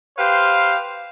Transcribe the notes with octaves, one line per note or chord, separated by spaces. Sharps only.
G4 B4 C5 F5